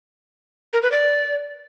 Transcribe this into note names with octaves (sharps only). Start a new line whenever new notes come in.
A#4
B4
D5